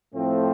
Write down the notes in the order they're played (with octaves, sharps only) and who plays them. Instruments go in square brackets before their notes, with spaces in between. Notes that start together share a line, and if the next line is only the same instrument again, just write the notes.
[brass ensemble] A2 F3 A3 C4